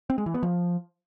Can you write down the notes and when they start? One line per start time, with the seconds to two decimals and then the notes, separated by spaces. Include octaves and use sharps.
0.10 C4
0.18 G#3
0.26 E3
0.34 B3
0.43 F3